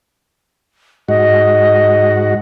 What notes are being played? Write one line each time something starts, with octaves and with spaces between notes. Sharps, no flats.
G#2 F#4 D#5